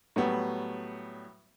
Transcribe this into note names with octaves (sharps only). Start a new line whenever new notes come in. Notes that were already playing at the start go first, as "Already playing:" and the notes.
A2 F#3 G3 B3